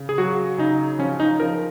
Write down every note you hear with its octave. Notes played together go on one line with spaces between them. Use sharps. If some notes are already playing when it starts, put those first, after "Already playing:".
Already playing: C#3
G#4
F#3 F#4
C#3 D#4
F3 C#4
D#4
F3 A#4